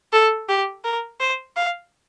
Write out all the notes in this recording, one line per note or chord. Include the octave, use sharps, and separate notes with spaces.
A4
G4
A#4
C5
F5